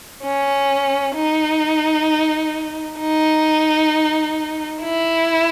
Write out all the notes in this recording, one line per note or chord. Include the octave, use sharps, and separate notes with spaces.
C#4
D#4
D#4
E4